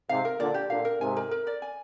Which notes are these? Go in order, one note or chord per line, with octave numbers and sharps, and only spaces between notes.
G#2 C3 F5
A#4
A#2 D3 D5
G4
A#2 D3 F5
A#4
G#2 C3 G#5
A#4
A#4
D5
G#5